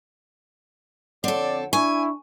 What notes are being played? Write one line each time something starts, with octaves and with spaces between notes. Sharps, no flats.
F2 D3 C4 A4 C#5 D5 F#5
D4 E4 G#5 C#6